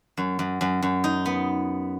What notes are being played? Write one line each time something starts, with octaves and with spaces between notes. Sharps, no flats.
F#2
F#2
F#2
F#2
D#4
B3